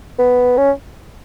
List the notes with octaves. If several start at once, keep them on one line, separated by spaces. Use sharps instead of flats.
B3
C#4